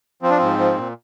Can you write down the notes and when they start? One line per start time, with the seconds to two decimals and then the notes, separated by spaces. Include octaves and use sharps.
0.23 F3 C4
0.30 D4
0.38 G#2 C4
0.58 F3
0.76 A#2